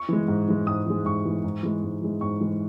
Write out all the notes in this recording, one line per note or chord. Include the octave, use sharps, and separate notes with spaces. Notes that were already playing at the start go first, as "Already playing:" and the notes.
Already playing: C#6
E3 G#3
G#2
E3 G#3
G#2 D#6
E3 G#3
G#2 C#6
E3 G#3
G#2
E3 G#3
G#2
E3 G#3
G#2 C#6
E3 G#3